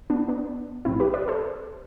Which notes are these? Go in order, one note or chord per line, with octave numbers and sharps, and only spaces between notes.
B3 D4
B3 D4
B1 A2 F3 C4 E4
G4 B4
B4 D5
A4 C5